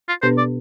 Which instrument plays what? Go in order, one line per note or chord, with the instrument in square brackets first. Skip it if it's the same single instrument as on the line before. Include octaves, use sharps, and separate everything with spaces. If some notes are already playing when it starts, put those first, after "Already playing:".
[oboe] F4
[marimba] B2 B3 D4 G4 B4 [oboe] C5
[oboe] D5